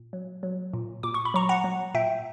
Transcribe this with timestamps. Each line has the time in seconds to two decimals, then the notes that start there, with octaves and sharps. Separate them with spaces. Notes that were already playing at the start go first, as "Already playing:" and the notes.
Already playing: A#2
0.13 F#3
0.43 F#3
0.74 A#2
1.03 A#2 D6
1.14 C#6
1.25 B5
1.34 F#3 A#5 C#6
1.49 F#5 A#5
1.64 F#3
1.94 A#2 E5 G5